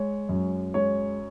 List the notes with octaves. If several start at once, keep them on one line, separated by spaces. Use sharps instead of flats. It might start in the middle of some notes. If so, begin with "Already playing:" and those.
Already playing: G#3 C#5
F#2
G#3 C#5